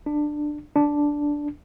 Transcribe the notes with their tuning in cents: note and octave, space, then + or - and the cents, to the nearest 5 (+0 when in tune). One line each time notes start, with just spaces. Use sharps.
D4 +15
D4 -5